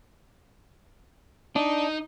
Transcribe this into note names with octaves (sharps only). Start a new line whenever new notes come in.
D4 D#4